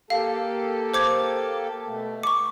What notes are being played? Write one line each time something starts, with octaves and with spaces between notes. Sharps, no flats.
A#3 G4 A4 F5
C5 D6 G#6
B2 A3
C#6 D6